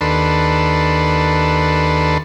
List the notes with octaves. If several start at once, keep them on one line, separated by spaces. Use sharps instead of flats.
D#2 D4 A4 B4 C6